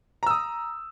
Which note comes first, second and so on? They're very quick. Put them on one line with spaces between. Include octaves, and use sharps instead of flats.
A#5 E6 D#6